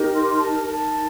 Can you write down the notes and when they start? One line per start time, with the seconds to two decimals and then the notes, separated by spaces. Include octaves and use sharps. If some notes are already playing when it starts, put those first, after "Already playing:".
Already playing: D#4 G4 A#4
0.14 C6
0.22 D6
0.29 C6
0.39 A5
0.65 D#4 A#4 A5